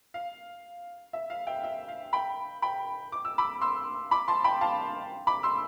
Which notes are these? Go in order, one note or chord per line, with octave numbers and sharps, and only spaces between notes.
F5
E5
F5
E5 G5
E5
F5
G5 B5
G5 B5
D6
E6
B5 D6
C6 E6
B5 D6
A5 C6
G5 B5
F5 A5
B5 D6
C6 E6